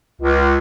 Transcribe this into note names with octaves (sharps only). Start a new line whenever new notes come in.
C#2